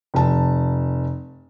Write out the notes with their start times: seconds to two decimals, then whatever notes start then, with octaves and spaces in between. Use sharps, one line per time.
0.14 F1 A5